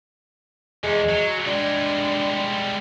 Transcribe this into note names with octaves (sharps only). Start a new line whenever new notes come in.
E2 G#3
F#3
G3 G#3 D4